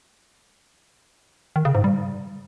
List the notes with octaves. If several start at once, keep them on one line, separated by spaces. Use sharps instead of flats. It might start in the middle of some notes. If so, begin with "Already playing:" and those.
D#3
C#3
G#2
G3